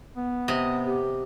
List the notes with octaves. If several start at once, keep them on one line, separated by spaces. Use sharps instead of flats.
B3
C3 D#5
G4